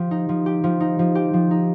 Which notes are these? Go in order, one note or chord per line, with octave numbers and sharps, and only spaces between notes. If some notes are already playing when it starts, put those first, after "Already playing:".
Already playing: F3 G4
D#4
F3
G4
F3
D#4
F3
G4
F3
D#4